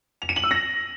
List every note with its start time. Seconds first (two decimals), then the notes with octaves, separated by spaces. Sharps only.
0.22 F7
0.29 D#7
0.36 F#7
0.44 E6
0.51 A#6